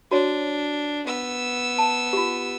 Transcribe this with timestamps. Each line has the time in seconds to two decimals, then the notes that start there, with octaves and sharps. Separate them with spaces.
0.11 D4 F#4 C#5
1.07 B3 E6
1.78 A5
2.13 F4 G4